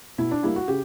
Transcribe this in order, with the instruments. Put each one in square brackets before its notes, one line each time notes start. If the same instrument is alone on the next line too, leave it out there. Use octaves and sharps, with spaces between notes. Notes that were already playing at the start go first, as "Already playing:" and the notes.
[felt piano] B2 E4
D4
G3 A#3 E4
F#4
C#3 G4